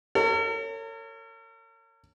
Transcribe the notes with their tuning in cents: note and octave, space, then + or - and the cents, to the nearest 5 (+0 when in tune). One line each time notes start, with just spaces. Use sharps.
A#4 -45 C#5 +0